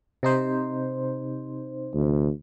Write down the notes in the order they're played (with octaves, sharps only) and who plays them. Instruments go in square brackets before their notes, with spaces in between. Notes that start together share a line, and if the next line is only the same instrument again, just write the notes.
[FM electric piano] C3 D#4 C5
[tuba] D2